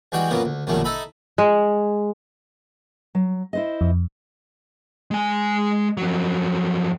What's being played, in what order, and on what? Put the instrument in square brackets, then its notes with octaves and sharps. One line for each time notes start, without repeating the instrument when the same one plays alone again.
[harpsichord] E2 G3 G#3 F#4 G5
F#2 A#2 F#3 A#3 B3
D2
A#1 F#2 B2 D#3 G3 A3
D#4 A4 E5 B5
[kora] G#3
[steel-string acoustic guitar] F#3
E4 C5 D#5
[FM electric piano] F2
[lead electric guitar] G#3 G#5
F2 F#3